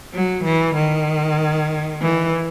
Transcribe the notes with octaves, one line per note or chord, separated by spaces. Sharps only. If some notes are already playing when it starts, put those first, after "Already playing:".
F#3
E3
D#3
E3